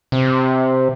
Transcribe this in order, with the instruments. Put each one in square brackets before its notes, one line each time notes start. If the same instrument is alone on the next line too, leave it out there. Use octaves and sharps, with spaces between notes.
[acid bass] C3